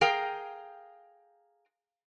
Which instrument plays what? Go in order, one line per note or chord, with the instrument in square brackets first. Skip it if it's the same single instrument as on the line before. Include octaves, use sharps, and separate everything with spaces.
[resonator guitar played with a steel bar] G#4 A#4 F5 G5